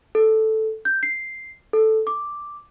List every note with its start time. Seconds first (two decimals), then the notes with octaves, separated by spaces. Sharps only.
0.15 A4
0.85 G6
1.03 C7
1.73 A4
2.07 D6